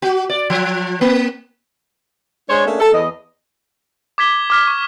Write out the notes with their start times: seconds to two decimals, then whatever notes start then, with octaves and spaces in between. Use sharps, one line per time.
0.02 F#4
0.29 D5
0.50 F3
1.01 A#3
2.50 G#3 D4 C5 C#5
2.66 A3 A#3 C#4 D4 G#4
2.80 A4
2.93 E2 D#5
4.18 D6 G#6 B6 G7
4.50 D6 F6 B6
4.67 C#6